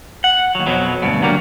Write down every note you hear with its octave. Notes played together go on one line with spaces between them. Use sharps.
F#5
D#2 F#3
F2 B2 F#3
D2 G2 B2
D3 F#3 G3 A#3